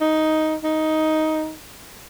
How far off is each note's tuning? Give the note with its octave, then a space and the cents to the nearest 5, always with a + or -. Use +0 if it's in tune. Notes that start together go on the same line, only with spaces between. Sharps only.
D#4 +5
D#4 +10